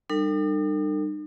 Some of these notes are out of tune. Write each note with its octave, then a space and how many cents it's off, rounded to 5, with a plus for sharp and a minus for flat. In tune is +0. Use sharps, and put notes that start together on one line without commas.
G3 +5 D#4 -45 A4 +45